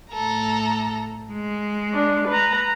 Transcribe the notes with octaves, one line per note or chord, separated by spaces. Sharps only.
A2 A4 A#5
G#3
D4
B4 A#5